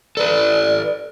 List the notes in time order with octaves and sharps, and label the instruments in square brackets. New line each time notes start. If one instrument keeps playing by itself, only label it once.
[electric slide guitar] A4 B4 [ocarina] D5